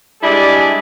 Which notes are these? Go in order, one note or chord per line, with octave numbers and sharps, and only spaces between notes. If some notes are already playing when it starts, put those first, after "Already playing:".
G3 G#3 D4 E4 G#4 D5